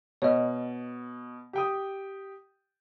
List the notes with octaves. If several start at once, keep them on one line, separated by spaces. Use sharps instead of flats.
B2 C#5 D#5
G4 G5 D#6